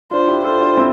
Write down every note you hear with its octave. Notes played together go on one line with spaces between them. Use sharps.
D4 F4 C5
E4 G4
F4 A4 C5
D4 F4
C4 E4